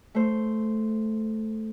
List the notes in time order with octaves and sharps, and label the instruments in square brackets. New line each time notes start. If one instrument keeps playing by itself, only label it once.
[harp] A3 C5